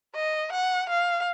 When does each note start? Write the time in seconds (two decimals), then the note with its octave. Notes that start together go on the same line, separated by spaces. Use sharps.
0.15 D#5
0.52 F#5
0.90 F5